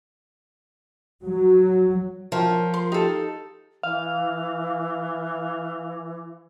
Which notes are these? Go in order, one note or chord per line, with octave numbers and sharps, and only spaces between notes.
F#3
F3 A#4 C#5 G5
A#4 C6
D#4 G4 A4 G5
E3 F5